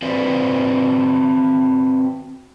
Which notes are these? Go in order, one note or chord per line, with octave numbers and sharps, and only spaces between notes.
C4 F#4 B4 C5 D5